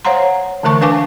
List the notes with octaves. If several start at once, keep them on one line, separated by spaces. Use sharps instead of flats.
C5 C#5 F5 F#5 A#5 C6
D3 E3 A3 A#4 A5 C#6
D4 B4 F5 G#5 A5 D6